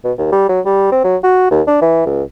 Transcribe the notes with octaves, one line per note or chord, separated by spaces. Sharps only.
B2
D#2
G3
F#3
G3
C4
F#3
F#4
D#2
D4
E3
C#2